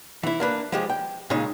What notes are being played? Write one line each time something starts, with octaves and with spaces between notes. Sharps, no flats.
E3 E4
A#3 D4 B4
F3 G#3 G4
G5
A#2 C#3 G#3 D#4